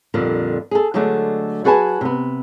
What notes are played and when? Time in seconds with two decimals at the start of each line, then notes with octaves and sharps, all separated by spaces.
0.14 F2 A#2 D3 G3
0.71 G#4 A4
0.94 D3 F#3 G#3 A3 D4
1.64 F#3 F#4 G#4 B4 G#5 A5
2.01 C3 B3